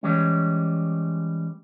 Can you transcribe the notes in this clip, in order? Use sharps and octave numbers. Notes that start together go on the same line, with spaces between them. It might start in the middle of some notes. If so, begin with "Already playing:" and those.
E3 G3 G#3 C#4